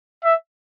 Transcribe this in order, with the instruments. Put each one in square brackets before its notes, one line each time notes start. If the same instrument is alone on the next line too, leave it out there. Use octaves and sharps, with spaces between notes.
[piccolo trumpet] E5